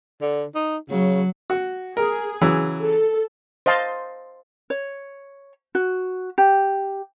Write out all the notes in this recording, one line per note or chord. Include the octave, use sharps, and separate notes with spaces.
D3
D#4
C#3 F#3
F#4
G#4 A#4
C#3 E3 F#3
A4
C5 D#5 F5 A5 C6
C#5
F#4
G4